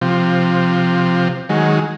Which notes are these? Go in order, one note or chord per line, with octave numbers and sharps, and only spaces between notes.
C3 F3
D#3 F#3 G#3